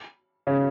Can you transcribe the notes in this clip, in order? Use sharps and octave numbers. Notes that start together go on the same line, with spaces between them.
C#3